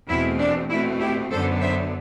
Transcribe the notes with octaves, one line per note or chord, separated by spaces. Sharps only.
E2 B2 A3 C4 E4
D4
B2 A3 C4 E4
E4 G4
F#2 D3 F#3 B3 A4 C5
C5 E5